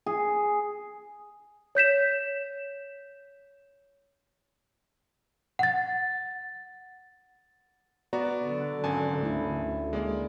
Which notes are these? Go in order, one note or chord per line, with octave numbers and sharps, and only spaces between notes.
G#4
C#5 G6 B6 E7
F#5 A6
B3 F#4 D5 A#5
D3 F#3
G#1 C#4 G#5 A5
D2 A3 D4 E4
G#3 A#3 D5